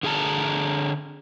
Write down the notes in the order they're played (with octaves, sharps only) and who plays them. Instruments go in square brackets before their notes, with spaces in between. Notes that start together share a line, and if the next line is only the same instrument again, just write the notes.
[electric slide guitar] D3 G#4 F#5 A5 A#5